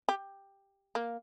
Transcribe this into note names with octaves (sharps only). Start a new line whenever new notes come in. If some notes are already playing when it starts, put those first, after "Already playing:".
G4
A#3